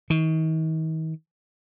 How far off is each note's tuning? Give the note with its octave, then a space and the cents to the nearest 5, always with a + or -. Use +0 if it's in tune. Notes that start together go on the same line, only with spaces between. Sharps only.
D#3 +40